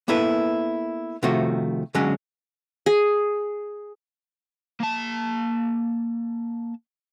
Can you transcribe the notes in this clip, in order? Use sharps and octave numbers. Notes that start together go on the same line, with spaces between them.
A#3 B3 E4 A4 B4
C3 D#3 F3 A3 F#4
D3 F#3 G#3 C#4 F#4
G#4
A#3 A5